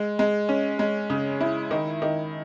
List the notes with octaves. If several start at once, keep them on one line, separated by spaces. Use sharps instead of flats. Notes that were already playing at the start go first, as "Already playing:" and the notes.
Already playing: G#3
G#3
C#4
G#3
C#3
E4
D#3
D#3